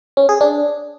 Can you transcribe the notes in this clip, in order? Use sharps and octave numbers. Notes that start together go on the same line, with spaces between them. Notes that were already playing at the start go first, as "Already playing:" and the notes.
C#4
G#4
D4